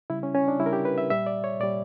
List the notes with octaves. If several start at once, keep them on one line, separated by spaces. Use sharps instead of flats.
C#3 G3 E4
C#4
C#4
D4
C#3 G3 E4
A#4
G4
B4
E5
A#2 G3 E5
D5
C#5
A#2 G3 D5